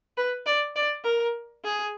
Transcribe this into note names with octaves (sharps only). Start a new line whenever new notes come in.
B4
D5
D5
A#4
G#4